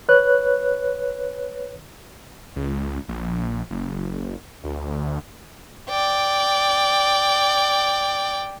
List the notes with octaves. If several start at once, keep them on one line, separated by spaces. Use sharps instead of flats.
B4 C#5 F#6
C#2
A#1
F#1
D2
D5 G5